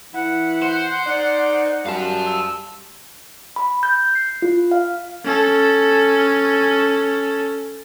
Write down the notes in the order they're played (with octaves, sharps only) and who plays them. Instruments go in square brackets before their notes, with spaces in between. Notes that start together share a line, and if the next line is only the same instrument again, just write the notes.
[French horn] E3 [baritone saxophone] E4 [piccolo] F#5
[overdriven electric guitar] C5
[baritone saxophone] D#4 [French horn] D5
[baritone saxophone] F#2 [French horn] G3 [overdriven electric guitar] F5 A5
[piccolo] E6
[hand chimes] B5
G6
C7
F4
F5
[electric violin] C#4 A4